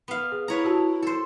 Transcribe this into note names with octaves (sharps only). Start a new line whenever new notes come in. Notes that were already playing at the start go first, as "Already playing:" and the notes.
B3 F5
G#4
E4 B4 C#5 A#5
F#4 G4 A5
A4 C5